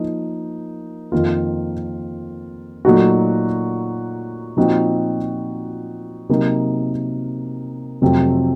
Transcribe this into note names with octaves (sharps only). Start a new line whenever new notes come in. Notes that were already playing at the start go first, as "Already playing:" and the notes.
Already playing: F3 A#3 D#4
F2 D#3 A#3 F4
A#2 F#3 A3 D#4 F#4
A#2 F3 C4 D#4 F#4
C3 F#3 A#3 D#4
F2 C3 F#3 A3 C4